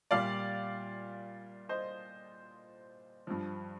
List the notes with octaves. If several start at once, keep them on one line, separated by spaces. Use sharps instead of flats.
A#2 G3 D5 F5
C5 D#5
G2 F3